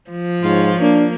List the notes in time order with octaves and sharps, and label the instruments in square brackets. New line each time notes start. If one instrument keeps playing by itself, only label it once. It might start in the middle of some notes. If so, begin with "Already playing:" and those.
[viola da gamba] F3
[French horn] G#2 [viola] F4 C#5
[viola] A#3 [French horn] D4